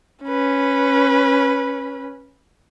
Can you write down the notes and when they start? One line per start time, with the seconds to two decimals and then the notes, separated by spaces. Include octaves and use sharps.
0.24 C#4 B4